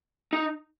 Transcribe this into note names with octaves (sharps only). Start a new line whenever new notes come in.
D#4